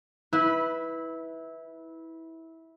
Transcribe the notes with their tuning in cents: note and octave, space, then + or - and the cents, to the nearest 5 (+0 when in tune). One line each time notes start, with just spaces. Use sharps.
E4 -20 B4 +0